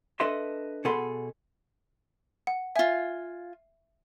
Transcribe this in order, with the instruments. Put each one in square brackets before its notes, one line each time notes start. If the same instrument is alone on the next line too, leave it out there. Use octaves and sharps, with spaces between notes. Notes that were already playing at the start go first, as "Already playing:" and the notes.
[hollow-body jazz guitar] D4 A4 B4 D#5 E5 C6
B2 G#4 A4 F#5 B5 C6
[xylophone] F#5
[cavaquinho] F4 G#5 [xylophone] E5